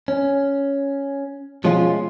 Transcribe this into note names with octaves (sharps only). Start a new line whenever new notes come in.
C#4
B2 F3 G#3 C#4 F4